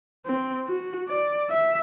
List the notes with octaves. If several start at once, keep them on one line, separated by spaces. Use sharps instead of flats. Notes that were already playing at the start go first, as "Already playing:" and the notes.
C4
F#4
D5
E5